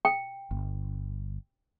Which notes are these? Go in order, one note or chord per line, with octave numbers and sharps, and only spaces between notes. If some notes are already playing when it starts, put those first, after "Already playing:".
G5
G1